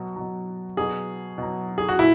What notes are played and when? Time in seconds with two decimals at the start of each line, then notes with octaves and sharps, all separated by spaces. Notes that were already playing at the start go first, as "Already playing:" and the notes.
Already playing: B2 F#3
0.16 B2 F#3
0.77 B2 F#3 G#4
1.38 B2 F#3
1.78 G#4
1.89 F#4
1.99 A#2 E4